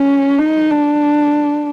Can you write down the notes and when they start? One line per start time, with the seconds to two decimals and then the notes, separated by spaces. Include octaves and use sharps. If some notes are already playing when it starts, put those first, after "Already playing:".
Already playing: C#4
0.38 D#4
0.70 D4